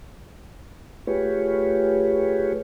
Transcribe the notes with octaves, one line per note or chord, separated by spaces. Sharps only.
A3 F4 G4 G#4 B4 C#5